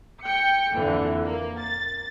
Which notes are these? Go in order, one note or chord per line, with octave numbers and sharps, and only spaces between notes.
G5 C#7
F2 A#2 D3 E3
A#3
A6